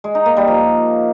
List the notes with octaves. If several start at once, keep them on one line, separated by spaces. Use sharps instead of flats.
G#3
D#4
A#3
G3
F3